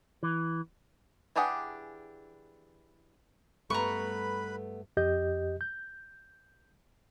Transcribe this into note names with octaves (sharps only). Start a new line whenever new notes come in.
E3
E3 D4 G4 G#4 F#5
G2 A3 B3 B4 A#5 B5 C#6
F2 G4 D#5 G6
G6